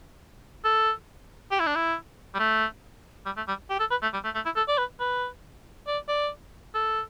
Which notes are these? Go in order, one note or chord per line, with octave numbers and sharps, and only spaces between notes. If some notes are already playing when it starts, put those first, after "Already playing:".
A4
G4
E4
D4
E4
G3
A3
G3
A3
G3
G4
A4
B4
A3
G3
A3
A3
E4
A4
D5
B4
B4
D5
D5
A4